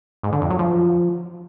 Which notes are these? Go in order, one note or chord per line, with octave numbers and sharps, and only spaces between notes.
G#2
D3
F2
F#3
F3